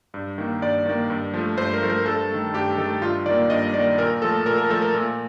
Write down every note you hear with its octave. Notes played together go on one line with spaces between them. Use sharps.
G2
D#3 A#3
G2 D5
D#3 A#3
G2
F3 A3
G2 C5
A#4
F3 A3
A#4
G2 A4
D#3 A3
G2 G4
D#3 A3 A4
G2 F4
D#3 D5
A#3
G2 D#5
D#3 A#3 D5
A#2 A#4
F3 A3 A4
A#2 A#4
A#4
F3 A3 A4
A#4
A#2